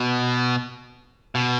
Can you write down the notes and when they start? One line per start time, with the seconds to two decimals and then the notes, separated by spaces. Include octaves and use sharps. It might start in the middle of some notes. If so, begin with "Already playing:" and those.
Already playing: B2
1.35 B2